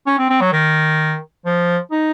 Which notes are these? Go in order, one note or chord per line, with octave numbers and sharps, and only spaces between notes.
C#4
C4
C4
F#3
D#3
F3
D#4